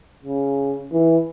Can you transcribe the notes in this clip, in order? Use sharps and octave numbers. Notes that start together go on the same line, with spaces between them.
C#3
E3